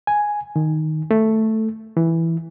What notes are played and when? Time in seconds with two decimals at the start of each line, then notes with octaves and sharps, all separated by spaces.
0.07 G#5
0.56 D#3
1.11 A3
1.97 E3